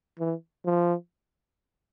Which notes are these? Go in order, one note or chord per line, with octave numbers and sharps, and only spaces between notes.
E3
F3